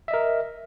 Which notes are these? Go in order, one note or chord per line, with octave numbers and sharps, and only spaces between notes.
A#4 D#5 E5